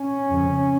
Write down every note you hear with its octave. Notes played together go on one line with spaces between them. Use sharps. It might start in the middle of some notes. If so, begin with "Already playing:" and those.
Already playing: C#4
F2 C#3